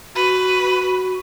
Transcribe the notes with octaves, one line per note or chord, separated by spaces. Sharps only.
F#4 B4